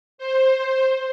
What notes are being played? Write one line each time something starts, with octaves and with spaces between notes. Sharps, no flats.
C5